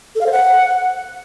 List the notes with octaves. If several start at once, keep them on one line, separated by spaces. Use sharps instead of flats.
A4
F5
C5
F#5